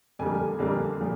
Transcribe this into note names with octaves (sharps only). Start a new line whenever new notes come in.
F2 D3 G3 A#3 G#5
F2 D3 G3 A#3
A#2 F3 A3